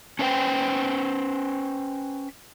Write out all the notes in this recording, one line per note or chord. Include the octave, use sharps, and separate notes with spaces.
C#4 D4 B4 C5 G5